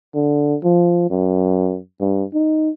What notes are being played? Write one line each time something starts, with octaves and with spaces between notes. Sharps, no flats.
D3
F3
F#2
G2
D#4